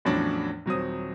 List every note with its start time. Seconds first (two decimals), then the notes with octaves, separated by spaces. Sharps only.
0.05 E2 A2 F3 F#3 C#4 D4
0.66 D#1 F#3 C4 D#6